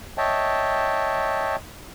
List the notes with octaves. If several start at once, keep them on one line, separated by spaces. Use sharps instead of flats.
C#5 D#5 E5 G5 A5